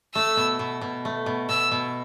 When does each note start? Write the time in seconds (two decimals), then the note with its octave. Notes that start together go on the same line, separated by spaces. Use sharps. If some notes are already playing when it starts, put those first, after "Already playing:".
0.14 A3 E6
0.37 B2
0.59 B2
0.81 B2
1.05 A3
1.26 B2
1.49 B2 E6
1.71 B2